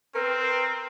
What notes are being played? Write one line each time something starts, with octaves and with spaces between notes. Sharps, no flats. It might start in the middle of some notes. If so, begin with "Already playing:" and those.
C4 A#4 B4